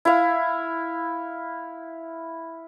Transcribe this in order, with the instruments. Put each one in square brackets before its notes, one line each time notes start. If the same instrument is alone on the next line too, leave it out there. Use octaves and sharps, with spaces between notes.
[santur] E4 F5